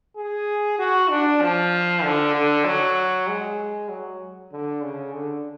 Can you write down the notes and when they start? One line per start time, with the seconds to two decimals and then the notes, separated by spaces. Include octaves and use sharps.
0.17 G#4
0.79 F#4
1.10 D4
1.41 F3
2.04 D3
2.34 D3
2.65 F#3
3.28 G#3
3.89 F#3
4.52 D3
4.83 C#3
5.13 D3